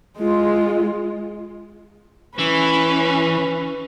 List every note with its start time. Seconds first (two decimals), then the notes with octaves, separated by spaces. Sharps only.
0.18 G#3 F4
2.39 E3 C#4 B4